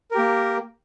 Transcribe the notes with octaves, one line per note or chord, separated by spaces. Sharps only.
A#3 G4 A#4